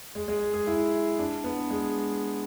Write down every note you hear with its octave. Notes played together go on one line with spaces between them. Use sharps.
G#3
G#3
G#4
E4
D4
B3
G#3